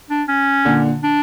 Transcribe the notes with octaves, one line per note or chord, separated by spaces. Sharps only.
D4
C#4
A#2 D3
D4